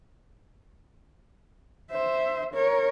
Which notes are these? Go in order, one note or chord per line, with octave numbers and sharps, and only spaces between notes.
C5 E5
A#4 C#5